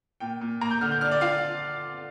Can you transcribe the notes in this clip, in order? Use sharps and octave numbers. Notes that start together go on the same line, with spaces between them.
A#2 G5
A#2
A#3 A#5
G6
D3 F6
G6
D4 F6
D5
F4 F5